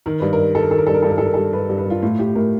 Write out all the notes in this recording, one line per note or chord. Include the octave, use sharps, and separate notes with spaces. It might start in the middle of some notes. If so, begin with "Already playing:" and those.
D#3 A#4
G2 B4
A#4
G3
D#3 A4
A#4
D#3 A4
A#4
G2 A4
A#4
G2 A4
A#4
G2 A4
A#4
G3 A4
G2 B4
G2
B4
G3 F4
A2 F4
A2 G4
A2 A#4